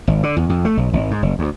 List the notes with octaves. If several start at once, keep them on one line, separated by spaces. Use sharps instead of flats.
G#1
D3
E2
F2
A3
B1
G#1
G#2
F#1
D2